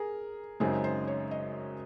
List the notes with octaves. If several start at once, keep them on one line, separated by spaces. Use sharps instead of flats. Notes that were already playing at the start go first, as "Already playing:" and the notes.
Already playing: G#4 A#4
F#2 C#3 G#3 C4 D#4 G#4
C5
C#5
D#5